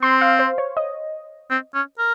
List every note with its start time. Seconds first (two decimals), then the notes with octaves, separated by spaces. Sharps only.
0.02 C4 C6
0.21 F5
0.39 C5
0.58 C#5
0.77 D#5
1.50 C4
1.74 C#4
1.99 A#4